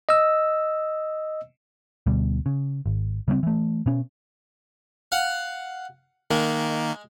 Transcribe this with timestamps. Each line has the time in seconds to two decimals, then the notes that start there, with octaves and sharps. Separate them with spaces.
0.09 D#5 E6
2.06 D2 B2 G3
2.46 C#3
2.86 G#1
3.28 C#3 G3 A3 C4
3.43 E3 A3
3.86 B2 C#4
5.12 F5 F#5
6.31 D#3 G#3 A#3